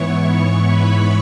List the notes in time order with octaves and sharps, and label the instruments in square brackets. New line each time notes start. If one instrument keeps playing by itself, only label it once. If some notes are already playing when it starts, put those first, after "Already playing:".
Already playing: [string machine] G#2 E3 B3 E4 C#5 C#6
C#5 C#6
B4 B5